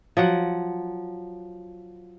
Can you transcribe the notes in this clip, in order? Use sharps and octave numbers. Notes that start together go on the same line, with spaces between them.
F3 F#3 F#5